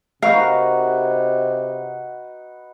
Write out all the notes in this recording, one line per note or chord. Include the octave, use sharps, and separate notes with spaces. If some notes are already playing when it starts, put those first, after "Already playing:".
C3 D#4 F#4 A#4 B4 F5